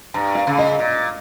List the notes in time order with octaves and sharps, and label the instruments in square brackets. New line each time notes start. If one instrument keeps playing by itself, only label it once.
[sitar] G2 [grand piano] A#5
[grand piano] F5
[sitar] C#3
[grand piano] D#5
[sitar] A#2